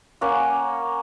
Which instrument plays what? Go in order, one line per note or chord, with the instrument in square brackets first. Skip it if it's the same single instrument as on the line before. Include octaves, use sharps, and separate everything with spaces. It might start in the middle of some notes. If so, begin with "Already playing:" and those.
[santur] A#3 C#4 F#5